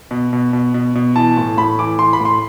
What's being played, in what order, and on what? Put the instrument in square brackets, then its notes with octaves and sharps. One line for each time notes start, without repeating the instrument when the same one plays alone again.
[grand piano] B2
B2
B2
B2
B2
E3 A5
A2
A2 B5
E3 D6
E3 C6
B5
A2
C6